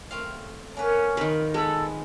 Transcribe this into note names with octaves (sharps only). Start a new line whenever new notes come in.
A3 C4 F5
A#3 C#4 B4
F2 D#3 D#4 A#4 B4
G#3 B3 A4 B5